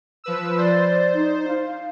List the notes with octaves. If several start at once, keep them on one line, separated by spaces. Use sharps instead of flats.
F3 B4 E6
C5 D5
D#4
F5